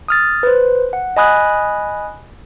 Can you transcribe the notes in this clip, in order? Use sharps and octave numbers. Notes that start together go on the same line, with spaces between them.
D#6 F6 A6
B4 C5
F#5
D#5 G#5 B5 D#6 F#6